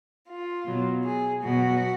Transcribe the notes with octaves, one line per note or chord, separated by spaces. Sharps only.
F4
B2 F#3
G#4
B2 F#3 F#4